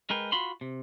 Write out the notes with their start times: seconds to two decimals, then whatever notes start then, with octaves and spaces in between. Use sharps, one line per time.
0.10 G#3 A#4 B4 G5
0.32 F4 F#4 B5 C6
0.61 C3